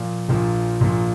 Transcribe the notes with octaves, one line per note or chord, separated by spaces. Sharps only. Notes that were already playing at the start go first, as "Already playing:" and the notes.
Already playing: A#2 F3
A#1 A#2 F3
A#1 A#2 F3